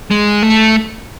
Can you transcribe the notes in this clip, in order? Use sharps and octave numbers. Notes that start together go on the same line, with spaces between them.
G#3
A3